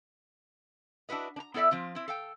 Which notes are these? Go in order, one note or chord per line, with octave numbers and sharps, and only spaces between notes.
D4 E4 F#4 B4 D#5
D4 A#5
B3 E4 A4 D5 E5
F3 C4 F4
C4 E4
A4 F5 G5